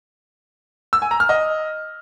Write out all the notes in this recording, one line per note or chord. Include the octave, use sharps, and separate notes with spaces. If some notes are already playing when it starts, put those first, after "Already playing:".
E6
G#5
A#5
F6
D#5